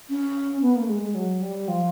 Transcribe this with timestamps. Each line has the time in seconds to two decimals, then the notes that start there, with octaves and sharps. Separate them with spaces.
0.09 C#4
0.62 B3
0.76 A#3
0.82 A3
0.89 G#3
1.03 G#3
1.15 F#3
1.42 G3
1.68 F3